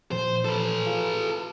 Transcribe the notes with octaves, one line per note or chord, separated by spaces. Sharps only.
A#2 E3 F3 C5
A4 B4
F4 G#4 F5